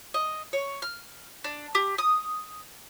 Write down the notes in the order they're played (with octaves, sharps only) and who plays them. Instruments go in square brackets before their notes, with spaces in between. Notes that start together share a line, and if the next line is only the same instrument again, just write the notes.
[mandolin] D#5
C#5
F6
D4
G4
D#6